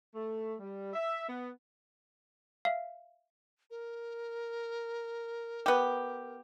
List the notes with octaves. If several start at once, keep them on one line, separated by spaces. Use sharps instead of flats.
A3
G3
E5
B3
E5 F5
A#4
B3 G4